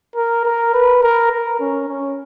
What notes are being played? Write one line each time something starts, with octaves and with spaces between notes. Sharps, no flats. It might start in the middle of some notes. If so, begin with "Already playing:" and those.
A#4
A#4
B4
A#4
A#4
C#4
C#4